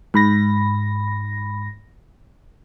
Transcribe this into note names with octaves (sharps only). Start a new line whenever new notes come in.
G#2 B5 A#6